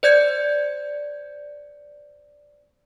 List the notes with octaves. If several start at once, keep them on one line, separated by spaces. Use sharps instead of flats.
C5 D5 G6 G#6 C#7